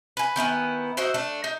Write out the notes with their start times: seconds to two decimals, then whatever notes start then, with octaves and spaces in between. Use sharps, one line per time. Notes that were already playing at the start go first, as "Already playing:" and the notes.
0.17 B4 G#5
0.36 D#3 B3 E4 G#5
0.97 D#4 E4 F#4 C5
1.14 A3 D4
1.44 D#4